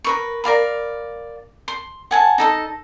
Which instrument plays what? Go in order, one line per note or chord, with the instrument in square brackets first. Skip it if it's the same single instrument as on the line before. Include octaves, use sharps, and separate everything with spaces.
[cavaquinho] A#4 B4 C#6
A#4 D5 F5 B5
C6
F#5 G#5 A5
D#4 A4 D#5